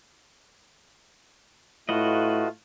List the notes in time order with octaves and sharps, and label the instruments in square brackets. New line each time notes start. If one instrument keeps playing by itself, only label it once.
[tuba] A2 [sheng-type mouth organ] A3 F4 [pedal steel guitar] F#4 B4 D#5